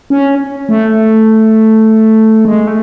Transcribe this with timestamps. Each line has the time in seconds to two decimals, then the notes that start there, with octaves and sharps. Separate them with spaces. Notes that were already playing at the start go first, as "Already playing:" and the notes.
0.10 C#4
0.69 A3
2.45 G#3
2.67 A3